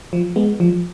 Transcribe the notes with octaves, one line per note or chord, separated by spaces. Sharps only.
F3
G#3 B3
F3